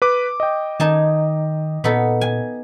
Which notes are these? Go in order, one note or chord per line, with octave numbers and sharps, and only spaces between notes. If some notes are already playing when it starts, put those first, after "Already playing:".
B4 D6
D#5 G5
D#3 D#4 G#5 A5
A#2 B3 D#4 A4
G#5